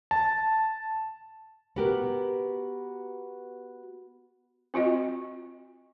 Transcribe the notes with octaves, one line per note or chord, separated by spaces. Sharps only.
A5
B3 F#4 G4 A#4
C4 F4 F#4 D#5